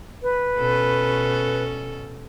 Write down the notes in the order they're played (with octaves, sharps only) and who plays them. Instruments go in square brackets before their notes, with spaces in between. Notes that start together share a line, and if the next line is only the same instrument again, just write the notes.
[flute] B4
[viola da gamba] B2 C#4 A4